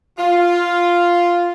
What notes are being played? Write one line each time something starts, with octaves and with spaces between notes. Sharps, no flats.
F4